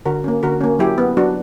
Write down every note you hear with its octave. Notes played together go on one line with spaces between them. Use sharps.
D3 F#4 A#4
A#3 C#4
D3 F#4 A#4
A#3 C#4
F#3 E4 G4
B3
F#3 D4 F#4